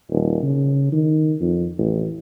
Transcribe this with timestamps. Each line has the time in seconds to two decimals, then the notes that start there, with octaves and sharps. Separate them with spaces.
0.10 D#1
0.43 C#3
0.92 D#3
1.41 F2
1.78 A1